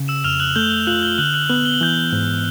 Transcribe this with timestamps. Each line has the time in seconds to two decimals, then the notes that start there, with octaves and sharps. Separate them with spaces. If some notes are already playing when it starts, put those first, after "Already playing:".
Already playing: C#3
0.08 E6 E7
0.24 F2 F6 F7
0.40 F#6 F#7
0.56 A3 G6 G7
0.87 F4 F#6 F#7
1.03 G6 G7
1.18 D3 F#6 F#7
1.34 F#6 F#7
1.49 B3 F#6 F#7
1.66 G7
1.74 F#7
1.81 E3 G6 G7
2.12 G#2